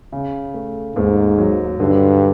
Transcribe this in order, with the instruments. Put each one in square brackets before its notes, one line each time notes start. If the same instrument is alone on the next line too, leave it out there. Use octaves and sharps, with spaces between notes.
[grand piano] C#3
A3
[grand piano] D#2 [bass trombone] G#2
[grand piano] F#3
[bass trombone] G2 [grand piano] D3